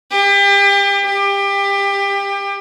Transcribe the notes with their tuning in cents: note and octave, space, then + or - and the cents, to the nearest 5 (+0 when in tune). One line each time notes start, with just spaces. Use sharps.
G4 +35
G4 +25